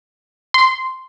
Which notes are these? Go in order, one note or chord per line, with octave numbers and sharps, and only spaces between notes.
C6